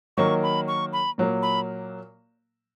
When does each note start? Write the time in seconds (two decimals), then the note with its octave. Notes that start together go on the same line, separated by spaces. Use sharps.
0.17 D#3 F#3 A#3 C#6
0.43 B5
0.68 C#6
0.93 B5
1.18 A#2 F#3 A#3
1.42 B5